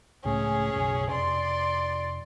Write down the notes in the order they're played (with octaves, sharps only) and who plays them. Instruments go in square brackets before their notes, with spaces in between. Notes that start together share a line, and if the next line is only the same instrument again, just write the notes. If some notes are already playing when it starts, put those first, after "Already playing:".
[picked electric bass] C#2 A2 A3 [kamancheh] C#4 G#4
[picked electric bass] F#1 B1
[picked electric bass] F1 [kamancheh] D5 C6